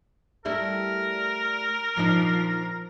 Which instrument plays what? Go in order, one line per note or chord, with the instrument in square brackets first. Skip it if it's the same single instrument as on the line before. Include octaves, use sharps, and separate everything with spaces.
[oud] G3 A3 E4 [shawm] A#4
[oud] A#2 D#4 [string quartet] F3